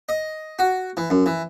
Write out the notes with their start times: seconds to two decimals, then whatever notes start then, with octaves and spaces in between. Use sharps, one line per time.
0.09 D#5
0.59 F#4
0.97 E3
1.10 F#2
1.26 E3